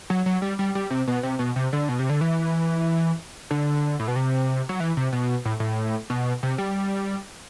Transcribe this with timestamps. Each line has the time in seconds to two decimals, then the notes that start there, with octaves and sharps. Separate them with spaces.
0.10 F#3
0.26 F#3
0.42 G3
0.59 G3
0.75 G3
0.90 C3
1.08 B2
1.23 C3
1.39 B2
1.56 C3
1.73 D3
1.89 B2
1.99 C3
2.10 D3
2.21 E3
3.51 D3
4.00 A2
4.08 B2
4.16 C3
4.69 F#3
4.80 E3
4.97 C3
5.12 B2
5.45 A2
5.60 A2
6.10 B2
6.43 C3
6.58 G3